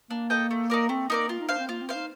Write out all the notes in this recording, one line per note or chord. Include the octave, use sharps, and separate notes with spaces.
A#3 D4
A4 D#5 G5
A3
D#4 A#4 D5
A3 C4
A#3 D#4 A#4 D5
F4
D#4
D4 C5 F5
C4
A#3 F4
C4
C5 F5
D#4